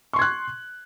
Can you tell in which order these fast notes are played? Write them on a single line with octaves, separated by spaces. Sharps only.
C#6 C6 G#6 F#6